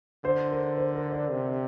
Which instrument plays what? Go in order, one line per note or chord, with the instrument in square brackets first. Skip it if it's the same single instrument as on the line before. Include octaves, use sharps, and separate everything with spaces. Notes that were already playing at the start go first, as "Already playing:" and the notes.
[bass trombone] D3 [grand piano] C5
[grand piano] A#4
C5
A#4
D5
[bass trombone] C3